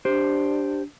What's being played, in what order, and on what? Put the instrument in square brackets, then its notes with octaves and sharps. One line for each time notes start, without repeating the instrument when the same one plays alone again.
[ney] D4 [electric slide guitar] G4 C5